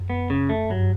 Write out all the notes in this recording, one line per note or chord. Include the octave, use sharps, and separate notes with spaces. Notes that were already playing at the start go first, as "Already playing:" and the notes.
Already playing: F#2
B3
C#3
A3
G2 F#3